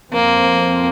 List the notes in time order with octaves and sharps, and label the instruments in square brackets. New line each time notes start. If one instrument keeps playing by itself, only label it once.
[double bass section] F2 F3 C4 [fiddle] A#3